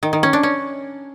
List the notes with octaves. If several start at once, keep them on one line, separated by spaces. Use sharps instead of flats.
D#3
D#3
C#4
D4
C#4